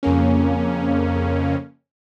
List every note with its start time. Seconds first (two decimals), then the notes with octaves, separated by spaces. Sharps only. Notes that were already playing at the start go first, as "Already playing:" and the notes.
0.03 F2 C#3 A#3 C#4